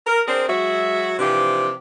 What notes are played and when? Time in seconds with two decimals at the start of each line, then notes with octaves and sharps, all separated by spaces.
0.06 A#4
0.27 C4 D4 G#4 A#4 C5
0.48 F#3 G#3 F#4 E5
1.19 C3 E3 F3 D4 G4